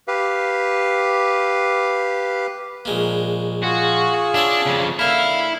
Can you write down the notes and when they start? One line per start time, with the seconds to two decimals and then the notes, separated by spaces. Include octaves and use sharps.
0.08 G4 B4 F5
2.85 A#1 G#3 A#3
3.63 F4 F#4 G#4
4.34 D4 E4 C#5 E5
4.67 F2 C#3
4.99 D3 A#3 E4 F5 F6